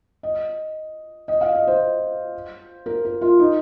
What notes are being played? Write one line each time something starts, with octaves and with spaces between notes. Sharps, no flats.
D#5
D#5
F5
D#5
C5
A#4
A#4
F4
D#4